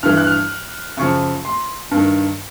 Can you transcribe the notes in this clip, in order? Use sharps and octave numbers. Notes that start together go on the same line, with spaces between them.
G2 E3 F6
F#6
F6
F#2 C#3 F3 C#6
C6
G2 D#3